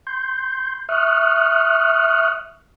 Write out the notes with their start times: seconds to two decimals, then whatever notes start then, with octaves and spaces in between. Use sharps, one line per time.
0.07 C6 G6
0.89 E5 C#6 D#6 F6 F#6